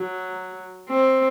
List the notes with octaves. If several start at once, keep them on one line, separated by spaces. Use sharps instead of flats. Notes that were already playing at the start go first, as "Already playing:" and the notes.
Already playing: F#3
C4